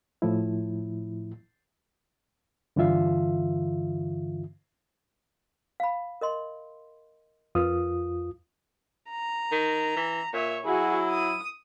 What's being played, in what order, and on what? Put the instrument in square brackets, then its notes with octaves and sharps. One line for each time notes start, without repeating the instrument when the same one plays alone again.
[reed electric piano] A2 F3 E4
G2 D3 E3 F4 E5 F5
[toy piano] F5 B5
A#4 D#5 C6
[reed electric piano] F2 F4 D#6 [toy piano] A#4 B4
[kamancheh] A#5
[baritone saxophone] D#3
E3
[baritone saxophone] A#2 [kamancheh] C#5 E5
[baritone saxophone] F#3 [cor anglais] E4 [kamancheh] F#4 G#4
[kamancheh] D#6